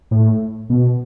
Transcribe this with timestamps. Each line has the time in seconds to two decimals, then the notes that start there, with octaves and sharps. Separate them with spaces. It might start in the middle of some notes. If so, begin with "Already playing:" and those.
0.11 A2
0.70 B2